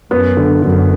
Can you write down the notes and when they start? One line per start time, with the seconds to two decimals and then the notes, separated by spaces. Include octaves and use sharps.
0.11 F#2 B3
0.37 D3
0.62 F#2 D3